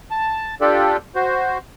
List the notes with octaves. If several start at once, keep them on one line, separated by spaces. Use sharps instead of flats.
A5
D4 F4 G4 A4 D5
F#4 C5